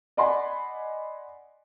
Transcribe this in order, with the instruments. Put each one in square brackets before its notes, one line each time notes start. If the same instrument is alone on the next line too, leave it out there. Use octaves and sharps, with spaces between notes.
[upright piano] D5 D#5 F#5 G#5 B5 C6